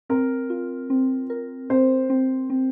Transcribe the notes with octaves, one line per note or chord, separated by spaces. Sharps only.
C4 A#4
F4
C4
A#4
C4 C5
C4
C4